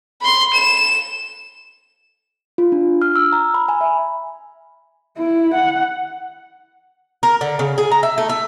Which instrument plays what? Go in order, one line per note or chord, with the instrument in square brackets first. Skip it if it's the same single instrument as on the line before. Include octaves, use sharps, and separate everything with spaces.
[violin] B5 C6
E7
[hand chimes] F4
D4
F6
E6
A#5
B5
G#5
E5
[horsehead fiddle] E4
F#5
[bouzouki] A#4
D3
C#3
G#4
A#5
E5
A3
E5